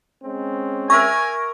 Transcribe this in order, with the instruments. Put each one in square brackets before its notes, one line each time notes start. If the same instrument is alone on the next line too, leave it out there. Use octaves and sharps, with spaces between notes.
[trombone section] G#3 C4 C#4
[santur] A#4 E5 A#5 [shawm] G#5 [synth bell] C#6